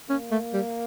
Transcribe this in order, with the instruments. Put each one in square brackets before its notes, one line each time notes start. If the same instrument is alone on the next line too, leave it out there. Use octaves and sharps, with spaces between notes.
[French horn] A#3 [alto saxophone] C#4
[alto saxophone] A3
G3